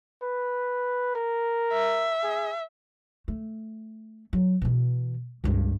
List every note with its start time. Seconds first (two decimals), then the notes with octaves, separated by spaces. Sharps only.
0.22 B4
1.15 A#4
1.73 E5
2.23 G#4
3.28 A3
4.33 F#3
4.62 B2 E3
5.44 C#2 G2